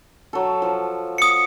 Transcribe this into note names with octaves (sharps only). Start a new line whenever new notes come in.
F#3 A4
F3
D#6 C#7